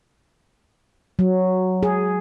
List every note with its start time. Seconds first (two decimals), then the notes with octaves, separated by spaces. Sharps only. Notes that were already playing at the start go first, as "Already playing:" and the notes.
1.19 F#3
1.83 G#4